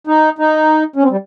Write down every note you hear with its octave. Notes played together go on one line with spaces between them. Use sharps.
D#4
D#4
C#4
C4
G3